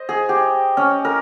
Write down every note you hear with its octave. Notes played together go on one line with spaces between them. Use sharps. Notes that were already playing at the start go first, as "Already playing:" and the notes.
Already playing: C5 D#5
G#4
G4
C#4
A#4